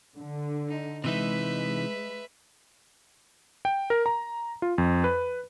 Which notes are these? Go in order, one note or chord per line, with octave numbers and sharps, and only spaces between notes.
D3
D#4
C3 E3 G#3 D#4 B4 E5
G5
A#4
A#5
F4
F2
B4